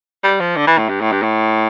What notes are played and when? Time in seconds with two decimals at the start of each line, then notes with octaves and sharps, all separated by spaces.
0.23 G3
0.40 F3
0.57 D3
0.67 E3
0.78 A2
0.89 G2
1.01 A2
1.12 G2
1.23 A2